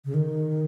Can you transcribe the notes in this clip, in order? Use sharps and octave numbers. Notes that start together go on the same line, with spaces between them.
C#3
D#3